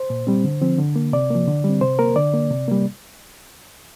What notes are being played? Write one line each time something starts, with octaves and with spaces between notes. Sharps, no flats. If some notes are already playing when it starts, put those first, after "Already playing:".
Already playing: C5
A#2
G3 C4
D3
F3 C4
D3
A#3
C3 D5
F3 A#3
D3
G3 C4
C3 C5
A#3 A#4
D3 D5
A#3
C3
G3 A#3